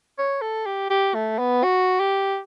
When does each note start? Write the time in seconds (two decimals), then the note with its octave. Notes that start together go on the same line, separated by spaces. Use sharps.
0.18 C#5
0.41 A4
0.66 G4
0.90 G4
1.14 A3
1.39 B3
1.63 F#4
2.00 G4